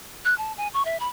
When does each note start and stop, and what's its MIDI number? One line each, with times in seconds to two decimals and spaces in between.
0.25 0.37 90
0.38 0.52 81
0.57 0.68 80
0.74 0.85 85
0.85 0.97 76
1.00 1.08 83